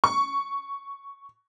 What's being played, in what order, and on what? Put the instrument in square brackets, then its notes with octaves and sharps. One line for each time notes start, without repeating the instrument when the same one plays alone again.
[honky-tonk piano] C#6